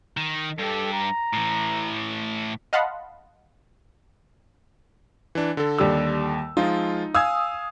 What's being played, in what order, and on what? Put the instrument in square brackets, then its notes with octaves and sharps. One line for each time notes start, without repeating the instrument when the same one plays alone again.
[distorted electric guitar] D#3
[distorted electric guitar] G2 G4 [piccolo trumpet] A4
[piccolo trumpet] A#5
[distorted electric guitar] A2 E3
[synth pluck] D#5 F5 F#5 A5 B5 C6
[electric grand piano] E3 D4
D3 A4
[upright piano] D#2 G3 E6
[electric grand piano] F3 G#3 F4 [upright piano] D#4
[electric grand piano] F5 G#5 [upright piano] D#6 E6 G#6